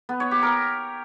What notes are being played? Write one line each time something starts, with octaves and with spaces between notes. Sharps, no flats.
B3
C#5
G4
A#4